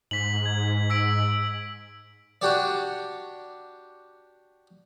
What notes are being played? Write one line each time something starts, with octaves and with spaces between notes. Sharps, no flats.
G#2 B6 F#7
G#6
E6 B6 D7
D4 F#4 G4 C#5 D5